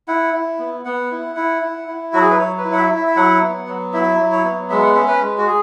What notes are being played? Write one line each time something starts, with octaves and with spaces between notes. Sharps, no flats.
E4 F#5
E4
B3
B3 F#5
E4
E4
E4
E4
F#3 F#4
G#4
B4
F#3 C#5
B4
E4
F#5
E5
E4
E5
E5
F#3 F#5
B3
F#3
E4 E5
F#3
C#5
B3
G#3 E5
F#5
C#4 E5
B4
G#3
F#4
G#4